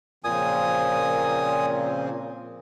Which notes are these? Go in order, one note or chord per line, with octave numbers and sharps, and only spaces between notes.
A#2 C#3 F3 C4 G#5 D#6